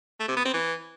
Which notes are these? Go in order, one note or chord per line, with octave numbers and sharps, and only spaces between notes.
A3
C3
B3
C4
E3